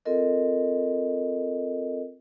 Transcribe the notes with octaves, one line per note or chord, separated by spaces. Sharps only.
C4 F4 A4 A#4 D#5